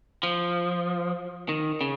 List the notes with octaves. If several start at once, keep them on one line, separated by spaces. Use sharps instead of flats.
F3
D#3
C#3